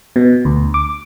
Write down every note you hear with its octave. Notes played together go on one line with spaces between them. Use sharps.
B2
D2
D6